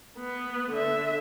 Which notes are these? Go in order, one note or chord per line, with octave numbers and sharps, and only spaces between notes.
B3
D3 E5